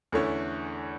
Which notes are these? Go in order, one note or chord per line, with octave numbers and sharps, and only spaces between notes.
E2 D3 A3 C#4 E4